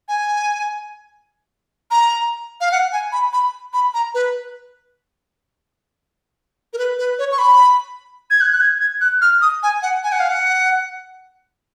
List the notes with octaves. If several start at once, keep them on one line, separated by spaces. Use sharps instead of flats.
G#5
A#5
F5
F#5
G#5
B5
B5
B5
A#5
B4
A#4
B4
B4
C#5
C#6
B5
G#6
F#6
F#6
G#6
G#6
F#6
F6
D#6
G#5
F#5
G#5
F#5
F5
F#5